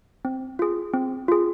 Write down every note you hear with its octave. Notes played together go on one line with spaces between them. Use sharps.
C4
F4 G#4
C4
F4 G#4